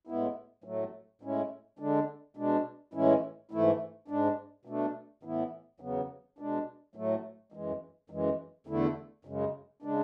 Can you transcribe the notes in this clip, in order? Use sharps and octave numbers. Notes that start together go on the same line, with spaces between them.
A2 G#3 B3 E4
A2 F#3 A3
A2 G#3 C#4 E4
D3 G#3 D4
B2 G#3 D4
A2 E3 G#3 C#4 E4
G#2 E3 A3 E4
G#2 G#3 D4
B2 A3 D4
A2 E3 B3 E4
E2 C#3 F#3 B3
B2 G#3 D4
A2 F#3 A3
F#2 E3 G#3
F#2 E3 G#3
E2 D3 A3 E4
F#2 C#3 G#3
C#3 G#3 D4